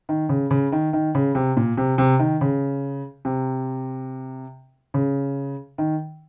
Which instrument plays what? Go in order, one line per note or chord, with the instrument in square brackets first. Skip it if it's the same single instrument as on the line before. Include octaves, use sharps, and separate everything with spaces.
[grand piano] D#3
C#3
C#3
D#3
D#3
C#3
C3
A#2
C3
C3
D#3
C#3
C3
C#3
D#3